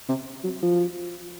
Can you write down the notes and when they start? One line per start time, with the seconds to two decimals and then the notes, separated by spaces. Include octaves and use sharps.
0.09 C3
0.44 F#3
0.62 F3